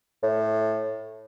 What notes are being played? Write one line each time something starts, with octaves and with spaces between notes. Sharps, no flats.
A2